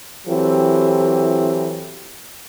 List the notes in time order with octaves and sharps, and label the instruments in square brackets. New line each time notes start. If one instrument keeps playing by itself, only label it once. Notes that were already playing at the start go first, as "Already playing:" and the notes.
[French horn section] E3 F#3 C4 E4 G4 A4